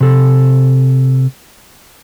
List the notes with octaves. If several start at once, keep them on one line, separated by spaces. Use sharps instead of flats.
C3 A4